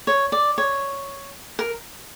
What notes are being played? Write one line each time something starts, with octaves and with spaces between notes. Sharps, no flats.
C#5
D5
C#5
A#4